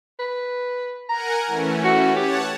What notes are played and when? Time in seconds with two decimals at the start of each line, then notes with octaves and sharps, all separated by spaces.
0.19 B4
1.09 A#4 F#5 G#5 A#5
1.47 E3 A3 C#4
1.84 F#4
2.16 G4 C#5 F#5 A5